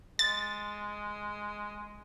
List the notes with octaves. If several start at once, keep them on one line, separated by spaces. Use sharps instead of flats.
G#3 A6